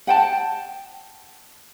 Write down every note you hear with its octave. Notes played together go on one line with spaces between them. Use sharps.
F#5 G5 A5